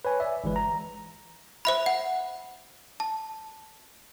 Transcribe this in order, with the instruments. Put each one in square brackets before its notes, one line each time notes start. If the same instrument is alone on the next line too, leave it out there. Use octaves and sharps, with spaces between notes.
[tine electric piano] B4 C#5 G#5
D5 E5
G1 E3 G#3 B4
A#5
[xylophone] C5 E5 B5
F#5
A5